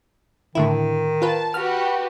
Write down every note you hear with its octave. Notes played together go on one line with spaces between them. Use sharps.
A2 D3 D#3 E4
F4 B4 A5
F#4 G4 B4 F6